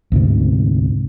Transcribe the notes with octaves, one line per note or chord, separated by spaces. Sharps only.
D2 G#2 C3